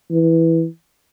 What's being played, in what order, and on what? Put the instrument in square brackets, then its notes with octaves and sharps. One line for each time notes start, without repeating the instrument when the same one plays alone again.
[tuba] E3